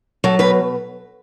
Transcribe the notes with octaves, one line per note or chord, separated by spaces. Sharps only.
F#3 A4
B2 B4